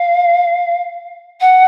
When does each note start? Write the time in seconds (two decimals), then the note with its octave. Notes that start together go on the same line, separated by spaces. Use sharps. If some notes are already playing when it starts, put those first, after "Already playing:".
Already playing: F5
1.40 F#5